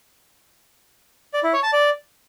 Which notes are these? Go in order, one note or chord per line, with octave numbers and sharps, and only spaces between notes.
D5
E4
C#5
A5
D5